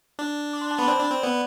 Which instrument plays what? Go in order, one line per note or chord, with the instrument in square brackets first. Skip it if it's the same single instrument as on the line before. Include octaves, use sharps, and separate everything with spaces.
[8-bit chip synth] D4
[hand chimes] D6
C6
A5
[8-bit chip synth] B3 [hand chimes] B5
[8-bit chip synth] C4 [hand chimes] D5
[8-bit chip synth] D4
C4
[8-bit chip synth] B3 [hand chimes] D5